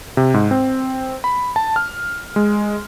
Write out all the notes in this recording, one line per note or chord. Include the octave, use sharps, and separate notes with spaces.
C3
G#2
C4
B5
A5
F6
G#3